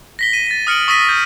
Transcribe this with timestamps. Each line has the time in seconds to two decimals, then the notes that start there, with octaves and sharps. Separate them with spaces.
0.19 A#6 B6 G7
0.33 D#7
0.47 A6 B6
0.67 D#6 F6 C#7 D7 F#7
0.88 C#6 D#6 E6 A#6 B6 D#7
1.09 G6